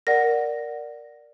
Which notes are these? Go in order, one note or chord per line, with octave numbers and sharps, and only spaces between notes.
A#4 D5 F#5 A#6